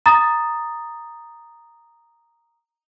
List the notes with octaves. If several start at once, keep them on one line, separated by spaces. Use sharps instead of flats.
A#5 D#6 A6